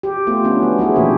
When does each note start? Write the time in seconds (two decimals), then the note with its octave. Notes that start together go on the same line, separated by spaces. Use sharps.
0.03 G4
0.27 A3 B3 F4
0.44 B3 C#4 D4
0.62 F#3
0.79 F#3 C#4 E4 G#4
0.95 A#2 E3 A#3 D4 G4